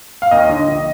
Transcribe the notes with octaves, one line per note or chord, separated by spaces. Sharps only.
F5
D#2 D#5
D3
A#1